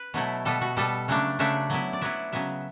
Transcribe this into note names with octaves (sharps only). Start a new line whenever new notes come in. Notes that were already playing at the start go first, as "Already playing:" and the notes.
Already playing: B4
B2 F#3 A3 E4
B2 G3 B3 A4
F#4
B2 G3 B3 A4
C#3 F#3 A3 D4
C#3 F#3 A3 D4 E5
F#3 B3 E4
D5
F#3 B3 E4 E5
C#3 F#3 B3 E5